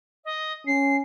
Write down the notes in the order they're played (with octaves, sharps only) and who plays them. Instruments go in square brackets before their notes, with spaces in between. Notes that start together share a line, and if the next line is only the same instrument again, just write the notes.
[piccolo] D#5
[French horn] C#4 [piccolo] C7